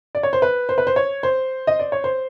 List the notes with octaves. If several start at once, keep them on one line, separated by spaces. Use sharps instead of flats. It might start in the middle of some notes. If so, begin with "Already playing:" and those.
D5
C#5
C5
B4
C5
B4
C5
C#5
C5
D#5
D5
C#5
C5